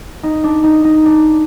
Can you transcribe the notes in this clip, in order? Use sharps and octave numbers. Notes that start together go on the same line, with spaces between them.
D#4
D4
D#4
D#4
D4